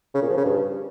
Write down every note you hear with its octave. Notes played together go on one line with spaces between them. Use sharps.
C#3
A#2
F3
C#3
G2